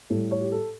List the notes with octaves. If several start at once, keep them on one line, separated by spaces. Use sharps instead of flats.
A2 G3 A4
C#5
G4
A4